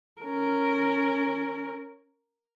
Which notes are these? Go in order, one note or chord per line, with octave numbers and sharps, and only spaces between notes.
C#4 A#4